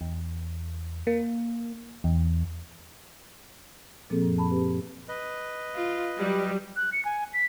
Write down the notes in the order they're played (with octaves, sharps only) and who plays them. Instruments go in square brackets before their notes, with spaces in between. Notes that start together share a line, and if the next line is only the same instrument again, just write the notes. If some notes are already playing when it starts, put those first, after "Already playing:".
[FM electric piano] E2
A#3
E2
[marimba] A#2 F3 A#3 C4 G#4 A4
F#2
A5 B5
C4 G4 B4
[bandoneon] B4 D#5
[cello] F4
[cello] F#3 [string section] G3
[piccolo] F#6
C#7
G#5
B6